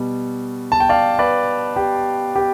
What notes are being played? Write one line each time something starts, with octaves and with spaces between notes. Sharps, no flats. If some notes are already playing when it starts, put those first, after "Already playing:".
Already playing: B2 G3
A5
G5
D5 F5
B4 D5
G4
G4